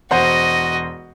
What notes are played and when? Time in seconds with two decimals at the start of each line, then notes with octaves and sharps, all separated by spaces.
0.11 E1 F#4 C5 D#5 F#5